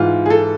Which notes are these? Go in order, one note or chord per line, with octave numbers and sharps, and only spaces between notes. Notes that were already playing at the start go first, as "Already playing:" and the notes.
Already playing: G#2 E3 F4
G#4
A4